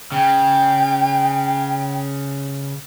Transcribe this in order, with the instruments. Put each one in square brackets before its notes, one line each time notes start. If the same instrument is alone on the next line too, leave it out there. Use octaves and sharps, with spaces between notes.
[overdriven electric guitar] C#3 [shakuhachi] G5